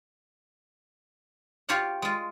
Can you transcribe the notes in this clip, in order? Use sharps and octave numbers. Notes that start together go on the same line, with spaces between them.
F4 G4 C#5 F5 F#5
G#3 F4